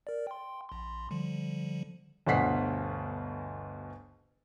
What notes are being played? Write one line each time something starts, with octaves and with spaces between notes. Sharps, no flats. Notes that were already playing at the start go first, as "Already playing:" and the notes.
A#4 D5
G5 C6
A#1 C6
D3 F3 G3
G1 D2 B2 F#5 B6 C7